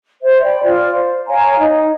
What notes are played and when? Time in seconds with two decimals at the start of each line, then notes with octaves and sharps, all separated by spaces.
0.22 C5 E5
0.42 D5 G5 B5
0.63 F4 C5 D5
0.92 C5
1.27 C#5 F5 G#5 A#5
1.58 D#4